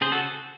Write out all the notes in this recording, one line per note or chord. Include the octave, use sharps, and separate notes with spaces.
C#3 G#4 C5
F#4 A4